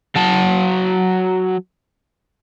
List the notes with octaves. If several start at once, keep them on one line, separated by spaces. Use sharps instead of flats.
F#3 A5